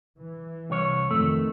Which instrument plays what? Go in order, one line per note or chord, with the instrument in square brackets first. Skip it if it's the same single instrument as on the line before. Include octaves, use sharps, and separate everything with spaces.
[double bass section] E3
[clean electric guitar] C2 C#5
[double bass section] F2 D#3 [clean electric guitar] A3